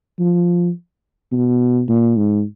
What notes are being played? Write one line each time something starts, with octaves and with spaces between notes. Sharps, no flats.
F3
B2
A#2
G#2